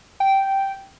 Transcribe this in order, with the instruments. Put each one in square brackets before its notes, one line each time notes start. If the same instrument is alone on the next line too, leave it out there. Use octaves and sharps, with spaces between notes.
[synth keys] G5